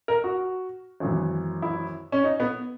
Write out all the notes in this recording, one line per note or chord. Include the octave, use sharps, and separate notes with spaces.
A#4
F#4
G#1 F#2 E3
E4
C#4
D#4
B3